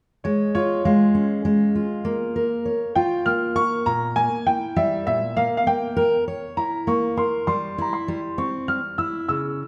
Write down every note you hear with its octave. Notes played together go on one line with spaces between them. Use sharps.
G#3 C#5
F4 C#5
G#3 F5
C#4
G#3
F4
A#3
A#4
C#5
F4 G5
A#3 F6
A#4 C#6
A#2 A#5
A#3 G#5
E4 G5
G3 E5
A#2 E5
A#3 F5
F5
A#3 G5
A#4
C#5
E4 A#5
A#3 C#6
A#4 C6
G3 C6
E4 A#5
C6
G3
C4 C#6
G3 F6
E4 E6
C#3 E6